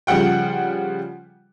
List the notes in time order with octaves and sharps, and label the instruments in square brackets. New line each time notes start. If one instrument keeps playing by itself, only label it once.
[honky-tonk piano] C#3 F3 G3 F#5 G5